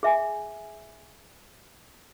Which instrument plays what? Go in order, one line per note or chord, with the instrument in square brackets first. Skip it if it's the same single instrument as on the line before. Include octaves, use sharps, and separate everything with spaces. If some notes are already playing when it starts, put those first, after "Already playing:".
[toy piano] G#4 E5 G#5